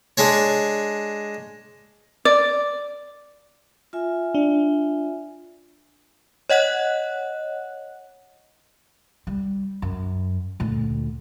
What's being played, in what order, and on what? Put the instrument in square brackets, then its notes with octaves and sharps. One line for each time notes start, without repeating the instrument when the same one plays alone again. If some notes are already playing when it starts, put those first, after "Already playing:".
[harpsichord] G#3 D4 C#5
[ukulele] D5
[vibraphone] F4 E5 G#5
[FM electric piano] D4
[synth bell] C#5 D#5 F#5 F#6
[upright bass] G3
F#2
D2 A#2